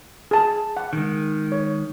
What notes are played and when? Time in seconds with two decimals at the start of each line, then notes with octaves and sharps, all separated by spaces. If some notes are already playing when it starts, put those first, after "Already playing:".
0.31 G#4 A5
0.77 F#5
0.93 D#3 G#3
1.52 C#5